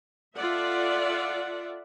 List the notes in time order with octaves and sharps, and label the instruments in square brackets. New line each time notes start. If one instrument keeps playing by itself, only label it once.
[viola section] F4 A4 D5 E5 F#5